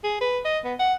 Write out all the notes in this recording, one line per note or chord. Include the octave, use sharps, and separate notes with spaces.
G#4
B4
D#5
B3
F#5